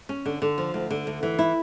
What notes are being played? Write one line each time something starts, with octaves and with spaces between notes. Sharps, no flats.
C#4
D3
D3
F3
D2
D3
D2
E3
E4